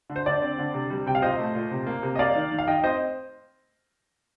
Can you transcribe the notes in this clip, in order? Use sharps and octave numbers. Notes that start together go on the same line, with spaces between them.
D3
C5
D3 D5
C4
D3
C3
G3
C3 G5
F5
A#2 C5 D#5
A3
A#2
C3
A#3
C3
D#5
A#3 D5 F5
D#3
D#3
F5
D#3 D#5 G5
C4 C5 D#5